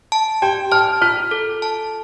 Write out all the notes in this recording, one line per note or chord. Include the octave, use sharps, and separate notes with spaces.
A5
G4 G5
A5 F6
F4 F6
A4
A5